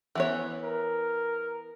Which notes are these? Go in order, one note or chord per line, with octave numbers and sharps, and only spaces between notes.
E3 B3 C#5
A#4